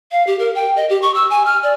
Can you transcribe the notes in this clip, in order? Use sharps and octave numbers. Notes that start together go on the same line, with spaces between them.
F5
G4
A#4
G5
D#5
G4
C#6
E6
G#5
F6
D5